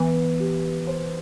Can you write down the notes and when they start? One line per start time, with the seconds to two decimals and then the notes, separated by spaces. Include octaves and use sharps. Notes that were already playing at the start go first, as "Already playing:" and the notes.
Already playing: E3 B3
0.40 G4
0.87 C5